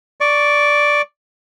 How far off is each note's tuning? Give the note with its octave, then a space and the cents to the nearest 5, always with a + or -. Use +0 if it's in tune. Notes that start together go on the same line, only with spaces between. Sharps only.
D5 -5 C#6 +10